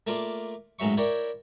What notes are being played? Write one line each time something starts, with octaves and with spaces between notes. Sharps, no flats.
A3 A#3 F4 D5
A1 G#2 F#3 E5 C#6
E4 A#4 C#5 D5 G5